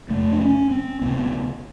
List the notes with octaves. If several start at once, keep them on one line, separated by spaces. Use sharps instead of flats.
F2 C3 A3
D4
C#4
C4
D2 C3 B3